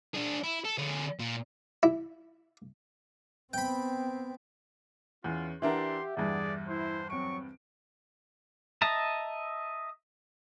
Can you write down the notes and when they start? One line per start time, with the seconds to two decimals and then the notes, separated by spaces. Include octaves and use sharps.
0.15 D4 G#4
0.44 E4
0.65 A4
0.78 D3 G#4
1.19 A#2
1.83 E4
3.53 B3 C4 G5 B5
5.24 E2 C#4 F4
5.62 E3 D4 G4 A#4 E5 F#5 C6
6.17 E2 G2 G#4 D5
6.68 E4 C5
7.10 F#3 C4 C#6 D7
8.82 D#5 E5 A5 A#5